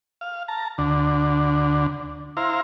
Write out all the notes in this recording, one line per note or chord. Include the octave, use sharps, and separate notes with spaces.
F5
A5 A#5
D2 D3
E4 C5 F5 A#5